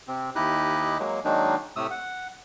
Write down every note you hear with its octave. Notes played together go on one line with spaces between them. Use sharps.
C3 C4
D#2 D#4 E4 G4 D#5 F#6
F#3 G#3 A#3
D#3 F#3 G#3 A#3 D4 D#4
A2 C3 A3 D#6 E6
F#5